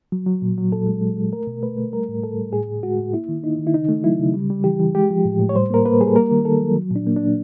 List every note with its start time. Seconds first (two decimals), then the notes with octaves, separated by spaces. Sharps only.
0.12 F#3
0.26 F#3
0.42 A#2
0.58 F#3
0.72 A#2 A4
0.87 G#3
1.02 G#3
1.17 G#3
1.32 A3 A#4
1.47 B2
1.63 A3 B4
1.77 A3
1.93 G3 A#4
2.09 A2
2.23 A2 A4
2.38 G3
2.53 A2 G#4
2.69 A2
2.83 G#3 F#4
2.99 A2
3.14 A#3 E4
3.29 D#3
3.43 A#3 D#4
3.59 D#3
3.67 E4
3.74 C#3 D#4
3.89 A3
4.04 F#3 E4
4.19 C#3
4.34 G3
4.50 G3
4.64 E3 G4
4.80 E3
4.95 G#3 G4
5.10 F3
5.25 A2
5.40 A2
5.49 C#5
5.56 G3 C5
5.70 A#3 A#4
5.86 A#3 B4
6.01 G3 G#4
6.08 A4
6.15 A#3 A#4
6.31 D#3
6.45 D#3 A4
6.60 F#3
6.75 F#3
6.91 A#2 D4
7.07 A#3
7.16 A#2 D4